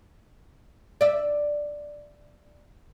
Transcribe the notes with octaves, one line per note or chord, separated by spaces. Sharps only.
D5 E5